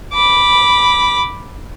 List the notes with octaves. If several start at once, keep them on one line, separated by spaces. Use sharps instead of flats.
B5 D6